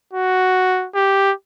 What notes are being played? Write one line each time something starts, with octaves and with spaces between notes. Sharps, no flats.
F#4
G4